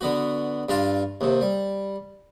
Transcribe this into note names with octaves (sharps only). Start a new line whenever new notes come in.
D3 B3 F#4
G2 D4 F4 A5
D#2 C3
G3